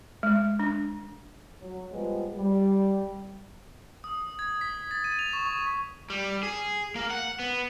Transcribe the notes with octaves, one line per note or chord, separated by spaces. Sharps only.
G#3
D4
F#3
F3 G3 G#3 B3
G3
D#6
G#6
B6
A6
D#7
F7
C#6
C#6
G3
G#4
A#3
F#5
B3